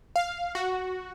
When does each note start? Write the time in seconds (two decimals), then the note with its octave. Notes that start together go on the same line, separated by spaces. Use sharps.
0.16 F5
0.55 F#4